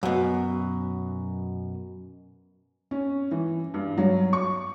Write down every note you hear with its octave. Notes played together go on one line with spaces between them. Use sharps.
F#2 B2
C#4
E3
G2
F#3
C#6